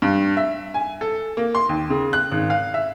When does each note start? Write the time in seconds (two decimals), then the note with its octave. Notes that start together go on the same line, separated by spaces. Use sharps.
0.02 G2
0.37 E5
0.74 G#5
1.01 A4
1.37 A#3
1.55 C6
1.69 D#2
1.90 C#3
2.13 F#6
2.31 G#1
2.50 F5
2.74 E5